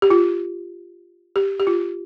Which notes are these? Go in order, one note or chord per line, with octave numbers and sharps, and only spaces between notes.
G4
F4
G4
G4
F4